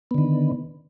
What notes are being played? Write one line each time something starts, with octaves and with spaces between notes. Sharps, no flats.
D3 D#3 B3